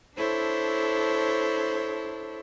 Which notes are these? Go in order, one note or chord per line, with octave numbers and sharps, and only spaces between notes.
D4 E4 A4 C5 C#5